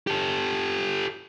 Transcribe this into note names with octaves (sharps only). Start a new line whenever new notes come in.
G4 A4